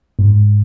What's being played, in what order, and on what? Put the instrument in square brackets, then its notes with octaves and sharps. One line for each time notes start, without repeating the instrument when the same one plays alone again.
[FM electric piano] G#2